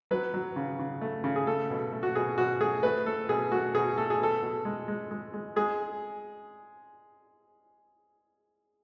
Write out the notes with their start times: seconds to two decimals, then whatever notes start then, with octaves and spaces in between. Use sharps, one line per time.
0.11 F#3 B4
0.34 F#3
0.56 C#3
0.79 C#3
1.01 A3
1.24 C#3
1.36 G#4
1.47 A3 A4
1.70 B2
1.92 A3
2.03 F#4
2.15 B2 G#4
2.38 B2 F#4
2.61 A3 G#4
2.83 A3 B4
3.06 A3 A4
3.29 B2 G#4
3.51 A3 F#4
3.74 B2 G#4
3.97 A3 A4
4.10 G#4
4.20 B2 A4
4.42 B2
4.65 G#3
4.88 G#3
5.11 G#3
5.34 G#3
5.56 G#3 G#4